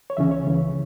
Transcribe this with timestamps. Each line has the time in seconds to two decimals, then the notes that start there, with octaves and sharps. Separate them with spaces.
0.10 C#5
0.17 C#2 C#3 E3 C#4 E5
0.31 C#5
0.46 C#2 C#3 E3